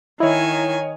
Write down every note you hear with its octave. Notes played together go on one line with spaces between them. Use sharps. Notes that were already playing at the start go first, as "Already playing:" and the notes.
D#3 E4 C#5 D#5 G#5